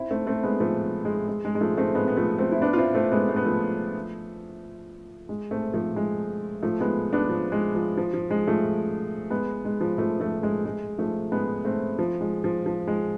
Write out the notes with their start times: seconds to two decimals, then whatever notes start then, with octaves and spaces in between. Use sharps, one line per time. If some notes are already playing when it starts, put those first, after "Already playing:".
Already playing: C4 E4
0.10 A3 C4
0.27 A3 C4
0.43 G#3 B3
0.60 F3 A3
1.05 G#3
1.28 G#3
1.45 G#3
1.55 G#3
1.61 F3 A3
1.78 A3 C4
1.95 G#3 B3
2.08 B3
2.17 F3 A3
2.38 A3 C4
2.52 E4
2.61 B3 D4
2.73 F4
2.78 C4 E4
2.95 A3 C4
3.11 G#3 B3
3.29 A3
3.36 B3
3.45 F3 A3
5.29 G#3
5.51 A3 C4
5.74 F3 A3
5.96 G#3
6.63 F3 A3
6.80 G#3 B3
7.13 B3 D4
7.29 F3
7.52 G#3
7.75 F3
7.97 F3
8.14 F3
8.30 G#3
8.48 F3 A3
9.30 G#3 B3
9.65 G#3
9.81 F3
9.98 F3 A3
10.20 F3 A3
10.43 G#3
10.65 G#3
10.98 F3 A3
11.32 G#3 B3
11.65 A3 C4
11.99 F3
12.21 G#3
12.44 F3
12.66 F3
12.87 G#3